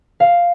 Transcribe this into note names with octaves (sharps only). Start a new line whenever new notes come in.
F5